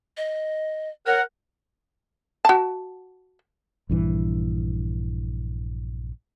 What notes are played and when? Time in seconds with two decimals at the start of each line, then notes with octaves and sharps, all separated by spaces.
0.17 D#5
1.06 A#4 C#5 F#5
2.45 F#4 A5
3.89 A#1 G2 E3